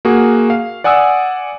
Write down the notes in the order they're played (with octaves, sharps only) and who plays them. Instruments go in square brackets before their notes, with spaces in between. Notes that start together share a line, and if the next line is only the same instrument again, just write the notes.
[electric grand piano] A#3 F#4 G#4
F5
D5 F#5 G#5 D#6 E6